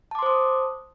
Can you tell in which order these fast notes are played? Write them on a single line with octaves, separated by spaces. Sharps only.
A5 D6 C6 C5 D#6